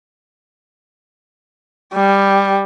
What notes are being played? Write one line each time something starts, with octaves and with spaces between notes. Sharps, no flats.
G3